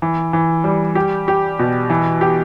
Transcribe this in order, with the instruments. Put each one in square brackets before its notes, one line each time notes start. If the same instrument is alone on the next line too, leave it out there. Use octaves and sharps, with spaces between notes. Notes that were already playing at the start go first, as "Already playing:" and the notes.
[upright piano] E3
E3
G3
G4
G4
B2
E3
G4